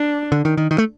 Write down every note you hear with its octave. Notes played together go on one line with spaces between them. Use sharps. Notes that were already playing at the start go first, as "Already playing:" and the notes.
Already playing: D4
D3
D#3
D#3
D#3
A3